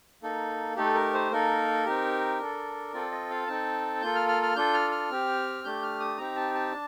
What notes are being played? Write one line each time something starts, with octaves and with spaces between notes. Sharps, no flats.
A#3 D#4 A4
A3 D#4 G4 A4
A#4
C5
A#3 D#4 A4 A#4
C4 D#4 G4
D4 A4
C4 F4 A4 D5
D#5
F5
C4 D#4 A4 A5
A#3 F4 A4 G6
F6
F6
F6
D4 F4 A4 G6
F6
F6
C4 G4
A3 D4 G4 G6
F6
D#6
C4 D#4 G4 A#5
A5
A5
D4